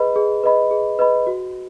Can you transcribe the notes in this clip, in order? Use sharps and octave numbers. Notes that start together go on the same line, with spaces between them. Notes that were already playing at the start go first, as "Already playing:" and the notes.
Already playing: G#4 B4 D#5 B5
G#4
B4 D#5 B5
G#4
B4 D#5 B5
F#4